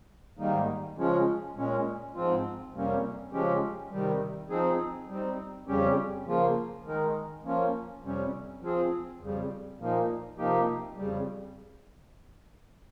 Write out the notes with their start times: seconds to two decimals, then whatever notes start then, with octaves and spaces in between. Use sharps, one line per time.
0.38 G#2 D#3 G3 A#3 D#4
0.97 C#3 F3 G#3 C#4 F4
1.56 A#2 G#3 C#4
2.14 G#2 F3 C4 F4
2.74 F2 C3 G3 A#3 C#4
3.32 C#3 F3 G#3 C#4 G4
3.91 C3 D#3 G3
4.49 F3 C4 D#4 G#4
5.08 G3 C4 D#4
5.67 F2 C#3 G3 C#4 G4
6.26 C#3 F3 A#3 F4
6.85 D#3 G#3 D#4 A#4
7.44 F3 A#3 C#4 F4
8.02 F2 C3 G3 C#4
8.61 F3 C4 F4 G#4
9.20 F2 C#3 G3
9.79 A#2 F3 A#3 D#4
10.38 C3 F3 A#3 D#4 G4
10.97 F2 C#3 G3